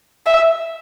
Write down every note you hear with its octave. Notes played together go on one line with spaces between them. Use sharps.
E5